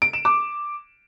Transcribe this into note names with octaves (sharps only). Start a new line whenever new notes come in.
D7
E7
D6